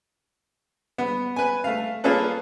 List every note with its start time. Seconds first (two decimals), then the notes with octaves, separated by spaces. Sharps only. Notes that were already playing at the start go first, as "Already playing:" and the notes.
0.98 B3
1.36 B4 G#5
1.64 A3 F5
2.04 A#3 C#4 F4 G#4 A4 B4